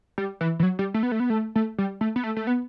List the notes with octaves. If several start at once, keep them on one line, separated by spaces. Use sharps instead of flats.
G3
E3
E3
F#3
G3
A3
B3
A3
B3
A3
A3
G3
A3
B3
A3
A3
B3